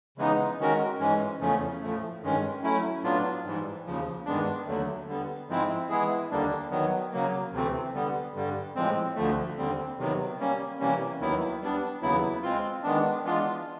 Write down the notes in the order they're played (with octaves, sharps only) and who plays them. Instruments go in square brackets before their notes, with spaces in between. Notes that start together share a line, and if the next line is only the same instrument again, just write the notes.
[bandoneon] C#3 E3 G#3 B3 D#4
D#3 G#3 C#4 F#4 A#4
G#2 E3 G#3 C#4
E2 C#3 F3 A3 C#4
A2 F3 A3
G2 D#3 G#3 C#4
F#3 A3 C#4 E4
A2 F#3 B3 D4 F4
G#2 E3 G3
D#2 C#3 F3
G2 D#3 G#3 B3 D4
D#2 D3 F#3 A3
D3 G3 B3
G#2 F3 G#3 C4 E4
E3 G#3 B3 E4 G#4
D#2 D3 G3 A#3 D4
D#3 F#3 B3
C#3 F#3 A#3
D2 C3 E3 A3 C4
D3 G3 B3
G2 D3 G3
A2 F3 G#3 C4
D2 D3 F3 A3
D#2 D3 G3 C4
C3 D#3 F#3 B3
G3 A#3 C#4
C3 E3 G3 A#3 C#4
D#2 D#3 F#3 B3 E4
G3 B3 D4
D#2 C#3 F#3 B3 E4
G#3 C4 F4
D#3 G#3 B3 D4
E3 G#3 B3 D4 F4